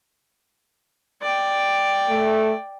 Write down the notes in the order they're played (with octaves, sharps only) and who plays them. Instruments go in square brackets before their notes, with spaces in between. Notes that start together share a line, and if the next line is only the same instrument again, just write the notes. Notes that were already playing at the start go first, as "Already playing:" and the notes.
[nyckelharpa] D5 G5
[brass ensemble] A3